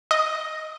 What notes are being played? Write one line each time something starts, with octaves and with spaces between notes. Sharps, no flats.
D#5